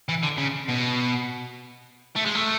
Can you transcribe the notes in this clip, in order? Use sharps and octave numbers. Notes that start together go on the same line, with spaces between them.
E3
D3
C#3
B2
A3
G#3
A3